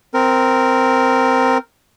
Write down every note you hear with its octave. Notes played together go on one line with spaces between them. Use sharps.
C4 A#4